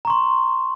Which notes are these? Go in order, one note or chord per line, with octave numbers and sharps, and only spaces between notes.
A#5 C6 C#6